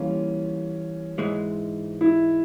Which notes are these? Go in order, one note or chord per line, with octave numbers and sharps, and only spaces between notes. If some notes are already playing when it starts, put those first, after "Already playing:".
Already playing: E3 G3 A#3 C#4 F4
G#2 E3 G#3
E4